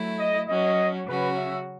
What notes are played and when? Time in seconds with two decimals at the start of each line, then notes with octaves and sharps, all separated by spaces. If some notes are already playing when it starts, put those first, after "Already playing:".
Already playing: F#3 A3 E4
0.19 D#5
0.48 F#3 C#4 F#4 D#5
1.07 C#3 F#3 C#4 F#4 B4
1.37 E5